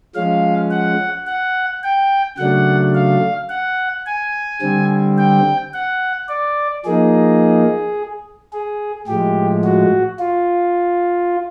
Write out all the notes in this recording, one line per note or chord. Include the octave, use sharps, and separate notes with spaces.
F3 G#3 C#4 F5
F#5
F#5
G5
C#3 F#3 A3 D4 F#5
F5
F#5
G#5
D3 G3 C4
G5
F#5
D5
F3 A#3 D#4 G#4
G#4
A2 F3 G#3 G4
F#4
F4